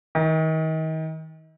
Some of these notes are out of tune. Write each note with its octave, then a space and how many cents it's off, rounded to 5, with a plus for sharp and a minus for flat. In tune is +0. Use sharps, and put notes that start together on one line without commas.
D#3 +35